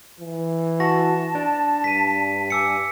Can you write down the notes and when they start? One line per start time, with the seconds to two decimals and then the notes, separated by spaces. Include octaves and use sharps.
0.20 E3
0.80 F#4 A5 A#6
1.35 D4
1.84 G2 B6 D#7
2.50 G#5 D6 E6 C#7